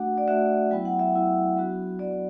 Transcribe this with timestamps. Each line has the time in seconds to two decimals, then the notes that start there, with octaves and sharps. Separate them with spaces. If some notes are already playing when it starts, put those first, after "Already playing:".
Already playing: A3 D4 F#4 F#5
0.18 D5
0.28 A3 D4 F#4 E5
0.71 F#3 B3 E4 G5
0.85 F#5
0.99 E5
1.14 F#3 B3 E4
1.57 F#3 B3 D4 F#4
1.99 F#3 B3 D4 F#4 D5